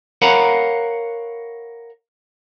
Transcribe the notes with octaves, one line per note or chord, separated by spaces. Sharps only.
A#4 C#5 F5 F#5 A#5 B5